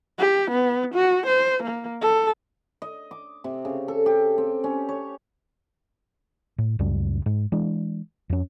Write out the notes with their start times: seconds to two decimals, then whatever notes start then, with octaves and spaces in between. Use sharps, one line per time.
0.19 G4
0.51 B3
0.95 F#4
1.27 C5
1.64 A#3
2.02 A4
2.82 D#5
3.11 D6
3.44 C3
3.65 C#3
3.88 A4
4.06 G4
4.38 C4
4.64 C#4
4.89 C#5
6.58 A2
6.79 C#2 F#2 C#3 G3
7.26 G#2
7.52 E3 G#3 D4
8.30 F2 C#4